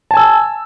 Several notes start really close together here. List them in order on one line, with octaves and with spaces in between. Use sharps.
A5 G#5 E6